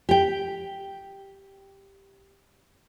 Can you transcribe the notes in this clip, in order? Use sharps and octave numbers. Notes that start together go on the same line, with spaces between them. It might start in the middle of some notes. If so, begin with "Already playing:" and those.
G4 G5